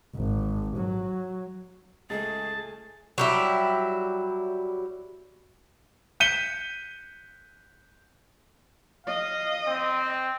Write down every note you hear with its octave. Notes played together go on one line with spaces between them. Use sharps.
G#1
F#3
C#2 A3 G#4 G#5 A5
F#3 G3 E4
G6 B6 C#7 D#7 G7
D#5 F5
C4